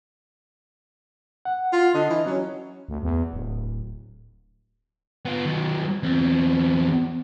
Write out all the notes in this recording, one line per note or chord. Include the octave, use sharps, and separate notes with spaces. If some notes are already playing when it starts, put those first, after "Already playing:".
F#5
F4
D3 D#5
E3
F#3 C#4
D2
E2
D1
B3 F4
D#3 F#3
E2 C4